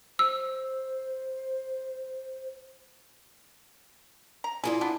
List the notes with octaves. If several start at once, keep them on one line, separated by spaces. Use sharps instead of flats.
C5 E6
A#5
E4 F4 G#4 D5
B3 D4